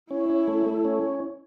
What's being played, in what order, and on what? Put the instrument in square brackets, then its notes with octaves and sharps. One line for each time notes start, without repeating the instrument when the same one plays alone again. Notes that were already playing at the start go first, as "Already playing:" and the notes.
[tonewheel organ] C#4 [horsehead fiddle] E4
[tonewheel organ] C#4
A3
A3
C#4